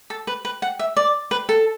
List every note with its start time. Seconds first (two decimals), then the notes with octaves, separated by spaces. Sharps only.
0.10 A4
0.27 B4
0.45 B4
0.62 F#5
0.79 E5
0.97 D5
1.31 B4
1.49 A4